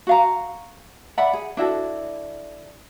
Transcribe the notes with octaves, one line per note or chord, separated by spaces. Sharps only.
F#4 F5 A#5
D5 E5 F#5 B5
G#4
D4 E4 F#4 A4